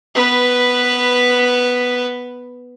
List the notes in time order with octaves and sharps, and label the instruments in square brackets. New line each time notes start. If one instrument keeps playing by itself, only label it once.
[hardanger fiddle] B3 B4